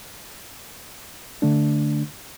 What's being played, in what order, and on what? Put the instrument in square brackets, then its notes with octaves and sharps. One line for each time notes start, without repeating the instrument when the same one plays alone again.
[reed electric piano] D3 A3 D4